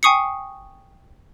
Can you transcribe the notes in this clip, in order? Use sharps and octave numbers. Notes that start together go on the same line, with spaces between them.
G5 G#5 C#6 D#6 C7 C#7